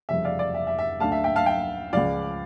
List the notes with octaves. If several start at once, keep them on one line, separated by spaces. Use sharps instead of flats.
F1 F2 C#3 G3 C#4 E5
D5 F5
D5
E5
E5
E5
D2 D3 A3 D4 F5 A5
E5
E5 G5
F5 A5
E5 G5
C#2 C#3 F3 D5 F5